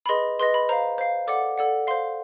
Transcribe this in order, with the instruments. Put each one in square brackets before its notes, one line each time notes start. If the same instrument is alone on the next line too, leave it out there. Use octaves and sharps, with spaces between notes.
[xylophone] B5
G#4 B4 D#5 C6
G#4 B4 D#5 C6
B5
C5 F5 A#5
C5 F5
A4 D5 F#5 D6
A4 D5 F#5
C5 F5 C6